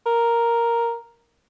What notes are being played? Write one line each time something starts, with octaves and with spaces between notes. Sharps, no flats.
A#4